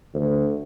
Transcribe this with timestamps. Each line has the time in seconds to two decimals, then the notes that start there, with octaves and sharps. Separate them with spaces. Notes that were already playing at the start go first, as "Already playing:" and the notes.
0.14 D2